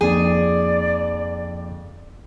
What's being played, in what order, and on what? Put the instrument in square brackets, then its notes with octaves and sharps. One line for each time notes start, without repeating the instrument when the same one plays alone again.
[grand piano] F2 [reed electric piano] F3 A#3 D#4 [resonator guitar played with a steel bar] G#4 [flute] D5